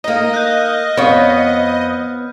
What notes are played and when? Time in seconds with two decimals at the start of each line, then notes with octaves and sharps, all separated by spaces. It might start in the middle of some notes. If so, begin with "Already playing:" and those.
0.04 A#3 D#4 D#5
0.34 F#6 G6
0.57 F6
0.97 F2 B3 C#5